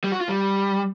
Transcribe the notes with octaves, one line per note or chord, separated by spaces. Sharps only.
G3
F#4
F4
G3